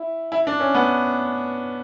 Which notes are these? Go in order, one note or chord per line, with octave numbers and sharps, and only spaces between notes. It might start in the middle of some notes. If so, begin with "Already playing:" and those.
Already playing: E4
E4
D4
C#4
B3